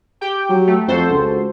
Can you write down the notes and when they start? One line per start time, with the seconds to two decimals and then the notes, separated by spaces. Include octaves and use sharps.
0.21 G4 G5
0.49 F#3
0.67 A3
0.88 F2 F#4 A4 C5
1.10 C#2